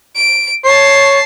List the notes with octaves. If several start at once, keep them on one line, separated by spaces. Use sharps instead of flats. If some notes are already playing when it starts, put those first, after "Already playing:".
D7
C#5 A5 C7